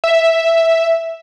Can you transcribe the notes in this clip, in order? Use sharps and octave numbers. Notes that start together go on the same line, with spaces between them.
E5